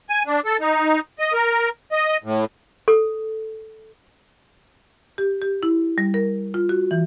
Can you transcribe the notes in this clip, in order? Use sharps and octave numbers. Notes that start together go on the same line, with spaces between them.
G#5
D4
A4
D#4
D#5
A#4
D#5
A2
A4
G4
G4
E4
G3
A#4
F4
F#4
E3